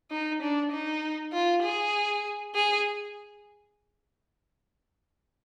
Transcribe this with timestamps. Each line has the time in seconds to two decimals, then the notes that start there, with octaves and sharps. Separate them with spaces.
0.11 D#4
0.42 D4
0.72 D#4
1.33 F4
1.63 G#4
2.55 G#4